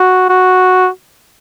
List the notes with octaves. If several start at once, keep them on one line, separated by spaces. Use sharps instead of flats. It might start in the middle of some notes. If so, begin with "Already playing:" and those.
Already playing: F#4
F#4